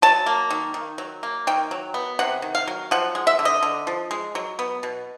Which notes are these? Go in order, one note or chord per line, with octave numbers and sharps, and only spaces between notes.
F#3 A5
A#3
D#3
D#3
F#3
A#3
D#3 G5
F#3
B3
C3 F#5
D#3
F5
F#3
F3 F#5
G#3
E5
D3
D#5
D3
F3
G#3
F#3
B3
B2